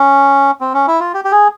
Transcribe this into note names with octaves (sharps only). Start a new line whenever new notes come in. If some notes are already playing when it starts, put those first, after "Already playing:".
Already playing: C#4
C4
C#4
E4
F4
G4
G4
G#4